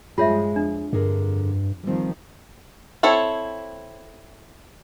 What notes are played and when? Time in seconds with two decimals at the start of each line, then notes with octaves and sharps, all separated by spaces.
0.18 G2 F3 G#3 F4 G#4 C#5 E5
0.56 F2 D4
0.93 G2 D3 G#4 A#4
1.83 D#3 F3 G3 C4
3.03 C4 E4 A4 C#5